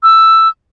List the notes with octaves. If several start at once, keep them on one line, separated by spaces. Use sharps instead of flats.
E6